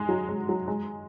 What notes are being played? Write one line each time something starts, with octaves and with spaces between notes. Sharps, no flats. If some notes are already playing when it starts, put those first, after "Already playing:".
Already playing: G#3
F#3
G#3
F#3
G#3